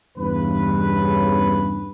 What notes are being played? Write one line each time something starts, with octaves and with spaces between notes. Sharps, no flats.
E2 G2 C#3 B4